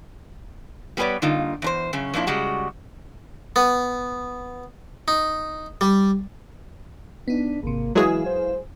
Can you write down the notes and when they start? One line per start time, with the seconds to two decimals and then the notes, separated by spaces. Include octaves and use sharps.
0.97 G3 B3 G#4 B4 C#5 D5
1.22 G2 D3 A#3 D#4 F4
1.62 E2 D4 C5
1.93 F#2 C#3 C#4
2.14 F2 A#2 A#3 D4 E4
2.27 C#3 G3 G#3 F#4
3.56 B3
5.08 D#4
5.81 G3
7.28 B3 D4 D#4
7.63 G#1 C3 A#3
7.95 E3 F#3 G#3 E4 G#4 B4 F5
8.26 C5